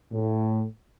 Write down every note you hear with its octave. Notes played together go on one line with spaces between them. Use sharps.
A2